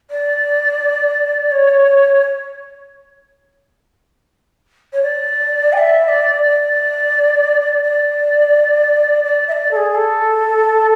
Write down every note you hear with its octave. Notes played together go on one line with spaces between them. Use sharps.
D5
C#5
C#5
D5
G#5
E5
D5
D5
D5
D5
E5
D5
A4
G#4
A4